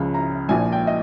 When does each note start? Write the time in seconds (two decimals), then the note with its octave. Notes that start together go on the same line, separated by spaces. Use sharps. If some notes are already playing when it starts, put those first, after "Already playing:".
Already playing: C#2 C#3 F3
0.14 A#5
0.49 A#1 A#2 F3 G#5
0.72 G5
0.87 D#5